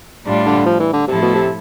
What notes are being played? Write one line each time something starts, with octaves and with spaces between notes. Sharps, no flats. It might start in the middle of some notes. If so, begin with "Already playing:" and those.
A2 G3 D4 F4
D3
F3
E3
D3
A2 C3 F3 A3 E4 A4
B2
C3